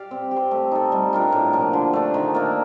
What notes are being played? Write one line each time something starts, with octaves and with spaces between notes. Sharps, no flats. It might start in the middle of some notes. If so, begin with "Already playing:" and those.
Already playing: G4 D5 F5
C4
G4
C5
A3
D#4 A4
G3
D4 F4 A#4
A2
F3 A#3
D3
A3 D4
D#3
A#3 D4